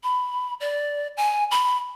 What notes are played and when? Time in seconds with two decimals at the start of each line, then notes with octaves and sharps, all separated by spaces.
0.03 B5
0.60 D5
1.17 G#5
1.51 B5